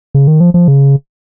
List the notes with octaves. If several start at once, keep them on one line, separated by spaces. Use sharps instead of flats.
C#3
D#3
F3
F3
C#3